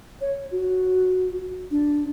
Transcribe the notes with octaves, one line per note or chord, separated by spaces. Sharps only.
C#5
F#4
D4